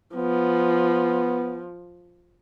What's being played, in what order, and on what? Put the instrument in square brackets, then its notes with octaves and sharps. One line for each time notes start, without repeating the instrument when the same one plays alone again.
[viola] F3 [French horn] B3